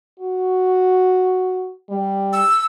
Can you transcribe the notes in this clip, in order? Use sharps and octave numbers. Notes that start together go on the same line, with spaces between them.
F#4
G3
E6